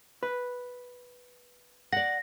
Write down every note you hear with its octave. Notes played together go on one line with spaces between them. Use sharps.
B4
D5 F#5 A#6